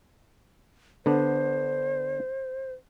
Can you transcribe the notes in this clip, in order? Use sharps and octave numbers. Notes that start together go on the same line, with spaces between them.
D3 B3 D4 C5